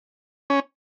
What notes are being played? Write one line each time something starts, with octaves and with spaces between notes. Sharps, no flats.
C#4